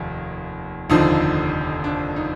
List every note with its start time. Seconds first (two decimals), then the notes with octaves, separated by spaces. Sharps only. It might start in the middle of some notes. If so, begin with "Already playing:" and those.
Already playing: F1 D#2
0.90 F1 D#2 D3 F3 D#4
1.84 D4
2.16 D#4